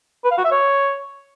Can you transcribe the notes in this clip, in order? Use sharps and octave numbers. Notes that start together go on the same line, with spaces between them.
B4
F5
F#4
E5
C#5